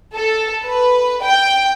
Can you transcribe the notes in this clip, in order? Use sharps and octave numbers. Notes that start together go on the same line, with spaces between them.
A4
B4
G5